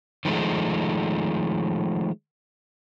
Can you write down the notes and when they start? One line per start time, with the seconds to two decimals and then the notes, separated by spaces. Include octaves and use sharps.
0.25 D#3 F3 G#3 A3